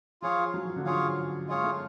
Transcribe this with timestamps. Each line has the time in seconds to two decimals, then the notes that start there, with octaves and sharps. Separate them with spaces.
0.22 F3 F4 G#4 C#5 F5
0.54 F#3
0.65 F3
0.76 D3
0.86 F3 F4 G#4 C#5 F5
1.49 G#3 F4 G#4 C#5 F5
1.64 A3